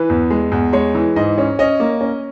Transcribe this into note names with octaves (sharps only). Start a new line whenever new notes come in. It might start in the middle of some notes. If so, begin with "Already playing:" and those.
Already playing: E3 B4
E2
G#3
E2
G#3 C#5
E3
G#2 D#5
C#4
C#4 D#5
A#3
C#4